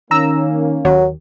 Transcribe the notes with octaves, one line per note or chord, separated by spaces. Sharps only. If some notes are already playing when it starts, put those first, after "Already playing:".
D#3 A#3 C#4 A#5 E6
D#2 F#3